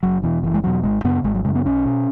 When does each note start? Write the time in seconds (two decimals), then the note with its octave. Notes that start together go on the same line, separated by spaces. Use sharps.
0.03 F#1 F#3
0.23 E2 B2 E3
0.43 F#1 E3
0.54 G#3
0.63 E2 B2 F#3
0.84 G#1 G#3
1.04 F#2 C#3 B3
1.24 G#1 G#3
1.35 F#3
1.45 F#2 C#3 G#3
1.55 B3
1.65 B1 C#4
1.85 B2